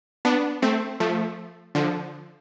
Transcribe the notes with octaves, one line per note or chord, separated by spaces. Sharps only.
B3 D4
A3 C4
F3 A3
D3 F3